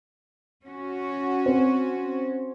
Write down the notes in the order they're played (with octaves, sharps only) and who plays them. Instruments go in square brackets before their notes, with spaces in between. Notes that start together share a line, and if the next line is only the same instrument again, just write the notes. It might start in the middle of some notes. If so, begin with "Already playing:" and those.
[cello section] C#4 F#4
[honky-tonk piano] C4